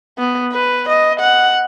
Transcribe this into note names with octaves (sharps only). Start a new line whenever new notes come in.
B3
B4
D#5
F#5